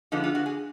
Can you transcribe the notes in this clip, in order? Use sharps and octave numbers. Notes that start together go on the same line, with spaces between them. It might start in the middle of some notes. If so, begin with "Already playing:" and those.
D3 F3 G#3 B3 D#4
F4
F#4
G#4